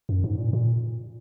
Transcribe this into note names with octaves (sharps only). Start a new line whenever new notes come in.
F#2
G#2
A#2
A#2